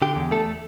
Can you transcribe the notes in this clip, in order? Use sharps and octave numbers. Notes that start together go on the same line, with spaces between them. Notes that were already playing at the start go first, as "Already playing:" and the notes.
D3 G4
E2
A3 A4